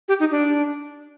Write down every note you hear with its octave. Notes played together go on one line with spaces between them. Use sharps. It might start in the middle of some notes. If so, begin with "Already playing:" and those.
G4
D#4
D4